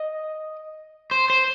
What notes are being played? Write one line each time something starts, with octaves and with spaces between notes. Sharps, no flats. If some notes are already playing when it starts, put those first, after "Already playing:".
Already playing: D#5
C5
C5